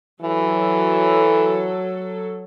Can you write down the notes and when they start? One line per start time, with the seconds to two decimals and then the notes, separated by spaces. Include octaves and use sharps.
0.22 E3 F#3 A4